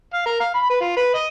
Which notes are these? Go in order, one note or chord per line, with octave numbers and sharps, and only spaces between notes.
F5
A#4
F5
B5
B4
F4
B4
D#5